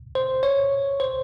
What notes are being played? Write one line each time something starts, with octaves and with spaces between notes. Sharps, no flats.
C5
C#5
C5